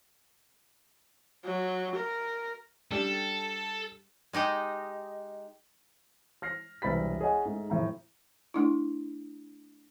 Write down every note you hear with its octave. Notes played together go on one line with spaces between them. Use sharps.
F#3
A#4
G3 D4 G4 A4
G#3 D#4 G4 D#5
F6 A#6 C7
E1 C2 B4 B5 A6 B6
G#4 C#5 D#5 F#5 G#5
G#2 A3
F1 A2 A#5
A3 D4 E4